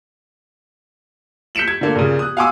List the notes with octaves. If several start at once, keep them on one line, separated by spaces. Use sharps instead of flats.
G6 B6 C#7 D7 E7 F#7
G#6
D3 A#3
A#2 C#3
D#6 F#6
F5 F#5 G#5 C6 D6 E6